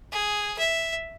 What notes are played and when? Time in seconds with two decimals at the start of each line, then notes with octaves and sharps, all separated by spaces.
0.12 G#4
0.58 E5